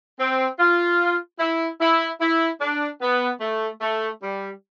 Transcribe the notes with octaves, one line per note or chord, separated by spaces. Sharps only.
C4
F4
E4
E4
E4
D4
B3
A3
A3
G3